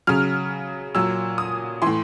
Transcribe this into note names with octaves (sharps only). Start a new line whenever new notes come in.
C#3 F#3 F6
A#2 F#3 E6
D#6
A2 E3 C6